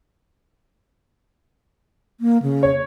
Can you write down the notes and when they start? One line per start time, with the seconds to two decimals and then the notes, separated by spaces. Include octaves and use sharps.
2.20 A#3
2.42 C#3
2.63 C#5